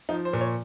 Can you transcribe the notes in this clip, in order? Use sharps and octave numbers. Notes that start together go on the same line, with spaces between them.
F3 D#4
C5
A#2
C#5